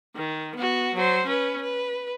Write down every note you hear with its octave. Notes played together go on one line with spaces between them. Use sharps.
D#3
B3 F#4
F#3 C5
C#4 B4
B4